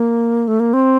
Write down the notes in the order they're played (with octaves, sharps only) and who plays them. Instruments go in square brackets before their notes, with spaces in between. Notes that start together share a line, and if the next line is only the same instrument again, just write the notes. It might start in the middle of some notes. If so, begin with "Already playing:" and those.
Already playing: [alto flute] A#3
A3
A#3
C4